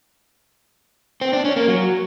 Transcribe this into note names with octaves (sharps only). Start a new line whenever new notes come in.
C4
D4
C#4
A#3
F#3